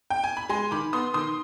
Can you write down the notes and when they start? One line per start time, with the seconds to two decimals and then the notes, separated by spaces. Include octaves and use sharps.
0.10 G5
0.24 G#5
0.37 B5
0.49 G#3 G#5 C6
0.71 D#3 B5 D6
0.93 B3 C6 D#6
1.14 D#3 C6 D#6